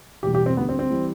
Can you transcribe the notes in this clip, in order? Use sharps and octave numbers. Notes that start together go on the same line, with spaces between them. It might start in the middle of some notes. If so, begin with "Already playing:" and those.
E1 E2 B2 G3 G4
G4
C4
D2 D3 G3 B3
C4
C4
E3 G3